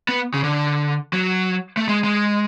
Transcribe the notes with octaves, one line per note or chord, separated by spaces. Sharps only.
B3
C#3
D3
F#3
A3
G#3
G#3